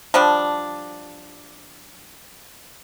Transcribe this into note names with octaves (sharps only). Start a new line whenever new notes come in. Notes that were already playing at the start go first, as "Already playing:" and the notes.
F3 G3 D4